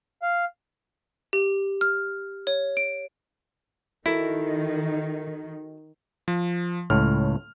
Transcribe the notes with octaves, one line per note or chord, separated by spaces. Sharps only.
F5
G4
F6
C#5
D7
D#3 E4 F#4 A4 A#4
F3
C#2 A2 F6